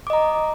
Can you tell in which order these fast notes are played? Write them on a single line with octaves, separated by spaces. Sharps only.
D6 D#5 A#5